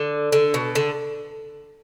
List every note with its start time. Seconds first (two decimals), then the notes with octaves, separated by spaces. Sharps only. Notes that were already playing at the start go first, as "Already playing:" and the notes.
Already playing: D3
0.32 D3
0.54 B2
0.75 D3